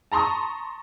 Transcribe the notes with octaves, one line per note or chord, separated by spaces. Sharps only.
A5 A#5 C6 C#6 D#6